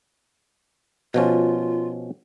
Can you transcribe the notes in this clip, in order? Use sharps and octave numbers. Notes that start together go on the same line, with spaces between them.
B2 F3 C#4 F4